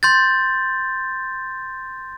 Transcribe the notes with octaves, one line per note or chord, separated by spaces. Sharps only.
C6 G6 A6